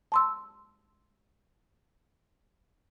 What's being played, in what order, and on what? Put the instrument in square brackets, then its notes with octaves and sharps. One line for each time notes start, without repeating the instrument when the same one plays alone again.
[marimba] A5 C6 E6